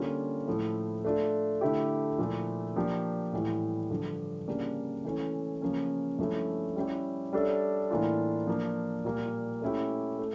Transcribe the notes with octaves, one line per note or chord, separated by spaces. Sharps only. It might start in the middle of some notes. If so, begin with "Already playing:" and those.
Already playing: D3 G3 A#3 C#4 F4
A2 F3 A3 E4
A3 D4 F4
D3 A3 E4 G4
A#2 F3 A3 E4
F3 A#3 D4 G4
A2 E3 G3
G2 D3 F3
C#3 G3 A#3 D4
E3 A3 C#4
C#3 F3 A#3 C#4
G2 F3 A3 C#4 E4
G3 C#4 E4 G4
G3 D4 A4 C#5 E5
A2 E3 A#3 D4 F4
F3 A#3 D4
A#2 G3 A#3
A3 C#4 E4 G4
A3